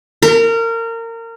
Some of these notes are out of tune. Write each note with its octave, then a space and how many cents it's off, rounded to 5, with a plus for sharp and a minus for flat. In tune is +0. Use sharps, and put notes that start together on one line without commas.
A#4 -25